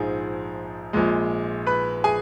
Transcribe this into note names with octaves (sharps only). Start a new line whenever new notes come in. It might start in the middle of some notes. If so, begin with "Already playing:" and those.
Already playing: A#1 G#2 F3 G#4
A#1 A#2 G#3
B4 B5
G#4 G#5